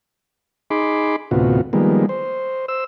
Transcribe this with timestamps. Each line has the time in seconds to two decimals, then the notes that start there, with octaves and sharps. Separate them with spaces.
0.70 D#4 G#4 B5 C6 D6
1.31 D2 A2 C3 B3 F4 F#4
1.73 D#3 F3 G3 G#3 A#3 B3
2.09 C5
2.68 C5 E6